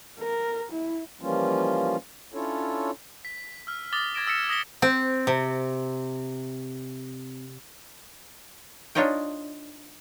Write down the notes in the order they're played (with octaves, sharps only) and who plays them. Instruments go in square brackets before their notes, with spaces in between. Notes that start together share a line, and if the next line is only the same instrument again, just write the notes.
[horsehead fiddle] A#4
E4
[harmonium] E3 F3 G3 A#3 C#4 F4
C#4 D4 E4 F4 A4 C#5
[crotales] B6
E6 F6
D6 D#6 A6 A#6 G7
D6 G#6 A#6 D7 E7
D#6 E6 A#6 B6 C#7 E7
D#6 A#6 B6 G7
[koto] C4
C3
D4 D#4 F4 C#5 D#5 G5